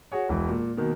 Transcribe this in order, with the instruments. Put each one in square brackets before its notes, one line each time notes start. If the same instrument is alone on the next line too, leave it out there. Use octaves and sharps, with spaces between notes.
[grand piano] F#4 G#4 C#5
E1 E3
A#2
B2 D#3 A#3